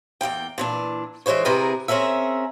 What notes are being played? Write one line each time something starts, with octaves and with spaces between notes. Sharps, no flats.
E2 D#3 A#3 G5
A#2 E3 D4
E3 F#3 G#3 C5 C#5
C3 E4 G#4 A#4 B4 A#5
C4 C#4 G#4 A#4 E5